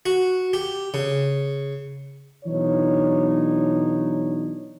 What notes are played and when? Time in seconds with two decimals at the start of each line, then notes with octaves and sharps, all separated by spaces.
0.06 F#4
0.53 G4
0.94 C#3
2.44 B1 E3 D4 D#4 C#5